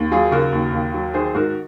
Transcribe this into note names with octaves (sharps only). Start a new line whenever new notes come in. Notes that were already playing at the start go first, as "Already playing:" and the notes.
Already playing: D#2
F#3 F4 G#4
C#3 F#4 A#4
D#2
D#2
F#3
D#3 G#4 C5
G#2 F#4 A#4